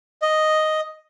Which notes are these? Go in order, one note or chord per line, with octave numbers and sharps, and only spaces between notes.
D#5